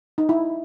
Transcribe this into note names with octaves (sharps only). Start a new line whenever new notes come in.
D#4
E4